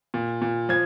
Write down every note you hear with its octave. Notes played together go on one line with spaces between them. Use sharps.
A#2
A#2
F3 G#6